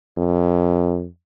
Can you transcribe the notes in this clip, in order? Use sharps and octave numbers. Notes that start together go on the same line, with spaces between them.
F2